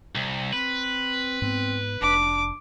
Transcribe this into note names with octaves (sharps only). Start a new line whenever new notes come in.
C2
C4 B4
G#2 B3 C4
F1 D4 D6